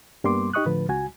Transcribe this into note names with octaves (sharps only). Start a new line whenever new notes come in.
G2 G3 A#3 B3 C6 D6
D#4 G4 D#5 C#6 D#6 F#6
A2 D3 F3 B4
C#2 F#4 G#5